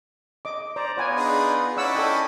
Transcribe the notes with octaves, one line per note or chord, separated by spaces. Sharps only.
D#5 D6
C5 D5 A#5
B3 F4 B4 C#5 G#5
D4 D#4 G#4
C#4 D#4 E4 D5 F#5 E6
A4 B4 D5 D#5 G5 G#5